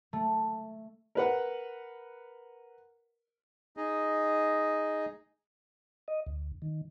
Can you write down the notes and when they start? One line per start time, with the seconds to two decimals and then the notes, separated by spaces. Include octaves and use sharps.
0.13 A3
1.15 A#4 B4 F#5
3.77 D#4 G#4 D#5
6.08 D#5
6.27 D2
6.62 D#3